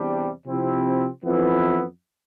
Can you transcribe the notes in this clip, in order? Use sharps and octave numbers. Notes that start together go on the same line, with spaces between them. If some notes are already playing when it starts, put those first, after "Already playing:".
Already playing: E2 C3 G3 D4 G4
C3 F3 C4 E4
F2 E3 B3 E4